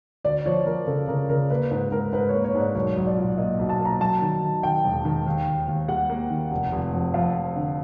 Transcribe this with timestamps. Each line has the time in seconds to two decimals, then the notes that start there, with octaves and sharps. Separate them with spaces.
0.24 D2 D5
0.46 F3 C#5
0.66 F3 A#4
0.87 C#3 A4
1.08 C#3 A#4
1.29 C#3 A#4
1.50 A#3 B4
1.71 G#2 B4
1.92 G#2 A#4
2.12 G#2 B4
2.29 A#3 C#5
2.44 C#5
2.55 G#2
2.60 D5
2.75 B1 C#5
2.97 B1
3.07 D5
3.17 A#2
3.37 A#3 D#5
3.59 B1
3.69 A5
3.80 A#3
3.85 A#5
4.01 F#3 A5
4.22 D#3
4.42 D#3
4.63 D#3 G5
4.84 E1
5.05 D#3
5.26 D#2
5.47 D#2
5.68 D#2
5.88 G3 F#5
6.10 A#3
6.30 D#3
6.51 F1
6.72 F1
6.93 F2
7.14 F2 F5
7.35 F2
7.56 D3